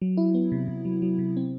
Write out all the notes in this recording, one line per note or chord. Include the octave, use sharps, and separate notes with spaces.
F#3
E4
B3
C3
C3
F#3
F#3
C3
C4